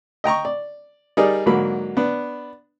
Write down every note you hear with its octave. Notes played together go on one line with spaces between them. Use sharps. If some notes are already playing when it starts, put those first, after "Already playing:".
D#5 G5 A#5 C#6
D5
G3 D#4 G#4 A#4 D5
G#2 D3 F#3 A#3 B5
B3 D4